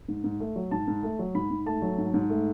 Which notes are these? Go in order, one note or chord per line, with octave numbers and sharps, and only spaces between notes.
G#2
G#2
A3
F#3
G#2 A5
G#2
A3
F#3
G#2 B5
G#2
A3 A5
F#3
G#2
G#2
A3